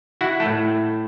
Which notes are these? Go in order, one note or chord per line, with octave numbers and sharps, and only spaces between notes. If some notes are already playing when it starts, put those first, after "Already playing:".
E4 F#4 F#5
A3 A4
A2